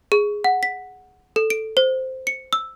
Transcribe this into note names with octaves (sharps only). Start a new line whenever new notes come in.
G#4
F#5
B6
A4
D7
C5
C#7
E6